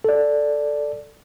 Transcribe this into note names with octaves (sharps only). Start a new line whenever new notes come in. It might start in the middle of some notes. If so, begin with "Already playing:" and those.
A4 D5